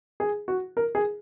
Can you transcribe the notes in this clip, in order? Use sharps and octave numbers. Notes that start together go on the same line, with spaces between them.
G#4
F#4
A#4
G#4